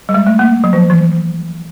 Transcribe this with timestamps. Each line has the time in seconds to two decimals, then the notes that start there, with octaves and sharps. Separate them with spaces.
0.09 G3
0.14 G#3
0.27 A3
0.39 A#3
0.64 F#3
0.73 F3
0.90 E3